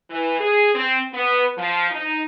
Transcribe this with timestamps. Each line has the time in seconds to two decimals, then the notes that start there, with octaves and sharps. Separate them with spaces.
0.10 E3
0.40 G#4
0.74 C4
1.13 B3
1.57 F3
1.91 D#4